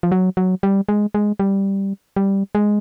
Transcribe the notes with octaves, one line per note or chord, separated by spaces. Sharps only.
F3
F#3
F#3
G3
G#3
G#3
G3
G3
G#3